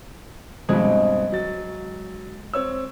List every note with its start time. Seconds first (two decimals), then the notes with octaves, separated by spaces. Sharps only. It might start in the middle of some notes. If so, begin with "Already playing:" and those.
0.69 G2 B2 G#3 C4
1.32 F#3 A6
2.54 C4 C#5 E6